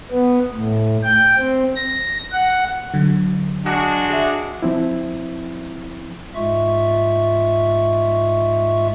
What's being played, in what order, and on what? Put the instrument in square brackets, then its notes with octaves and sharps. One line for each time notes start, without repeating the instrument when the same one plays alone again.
[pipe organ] B3
A2
G5
C4
A#6
F#5
[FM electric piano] D3 F#3
[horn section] G#3 D4 F#4
[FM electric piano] G#4 E5
[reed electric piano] F3 C4 E4
[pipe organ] G#2 G#3 F4 E5 C#6